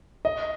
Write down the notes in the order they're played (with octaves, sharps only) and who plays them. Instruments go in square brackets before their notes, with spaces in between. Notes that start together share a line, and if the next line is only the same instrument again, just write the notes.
[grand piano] D#5